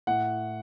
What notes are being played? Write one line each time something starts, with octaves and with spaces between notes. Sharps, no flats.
A2 F#5